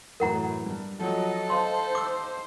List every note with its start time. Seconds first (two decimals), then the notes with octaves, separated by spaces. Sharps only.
0.20 F#2 A2 E3 A#4 F#5 A#5
0.66 G2
1.00 F3 F#3 A4 D#5
1.50 C5 D#5 F5 A5 C6
1.95 D6 E6